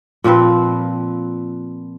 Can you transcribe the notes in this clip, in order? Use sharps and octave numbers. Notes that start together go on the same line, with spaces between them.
A#2 F3 C4 B4